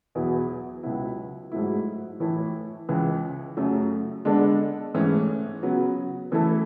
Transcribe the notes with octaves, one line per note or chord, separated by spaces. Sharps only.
E2 B2 F#3 B3 E4
C#2 B2 F#3 B3 E4
G#2 F#3 A3 E4
A2 E3 A3 E4 A4
C#2 C#3 E3
F#2 C#3 F#3 A3
D3 G#3 B3 D4 A4
G#2 E3 A3 C#4
C#3 F#3 B3
C#3 E3 A3 E4 A4